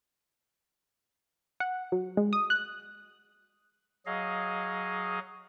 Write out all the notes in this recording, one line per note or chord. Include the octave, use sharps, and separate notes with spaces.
F#5
F#3
G#3
D#6
F#6
F#3 G#4 D#5 F5